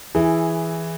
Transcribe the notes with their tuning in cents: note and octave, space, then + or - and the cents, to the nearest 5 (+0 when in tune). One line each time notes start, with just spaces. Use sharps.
E3 +0 E4 +0 G#4 +0